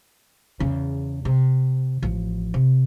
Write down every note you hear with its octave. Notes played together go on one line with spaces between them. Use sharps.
E2 C#3
C3
A1 F3
C3